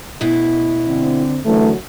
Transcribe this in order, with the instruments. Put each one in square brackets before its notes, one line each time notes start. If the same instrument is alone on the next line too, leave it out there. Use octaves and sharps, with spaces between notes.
[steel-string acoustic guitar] D2 B2 E4
[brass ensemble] D3 C4
[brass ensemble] F#2 F#3 [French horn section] D3 E3 A3